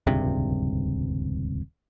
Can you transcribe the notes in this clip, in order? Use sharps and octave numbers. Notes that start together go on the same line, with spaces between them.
D#1 C#2 G2 C3